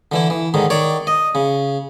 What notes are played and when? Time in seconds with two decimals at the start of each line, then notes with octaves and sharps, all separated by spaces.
0.12 D3 E3 E4
0.30 E3
0.54 G#2 D3 D#3
0.70 D#3 C#5 D5
1.07 D#5
1.35 C#3